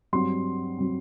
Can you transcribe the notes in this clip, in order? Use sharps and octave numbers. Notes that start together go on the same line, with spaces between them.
G2 F#3 C4 C6
F#3 C4